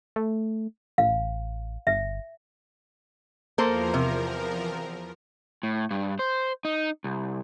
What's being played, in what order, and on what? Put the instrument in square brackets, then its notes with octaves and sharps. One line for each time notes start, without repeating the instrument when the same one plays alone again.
[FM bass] A3
[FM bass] A1 [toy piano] F5
[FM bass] G1 [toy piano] E5
[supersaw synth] E2 F3 A#4 [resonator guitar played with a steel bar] A#3 A4 C5
[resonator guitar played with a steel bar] C3
[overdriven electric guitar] A2
G2
C5
D#4
C2